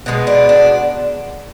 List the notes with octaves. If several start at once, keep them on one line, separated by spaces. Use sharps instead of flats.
B2 G#3 B3
D4
D4